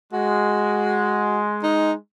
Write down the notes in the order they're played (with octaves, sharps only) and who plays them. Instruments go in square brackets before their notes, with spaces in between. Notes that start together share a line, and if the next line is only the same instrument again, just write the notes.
[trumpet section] G#3 [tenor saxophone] F#4
[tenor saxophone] D#4